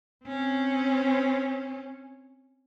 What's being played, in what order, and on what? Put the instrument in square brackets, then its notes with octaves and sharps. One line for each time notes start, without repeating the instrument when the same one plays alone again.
[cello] C4 C#4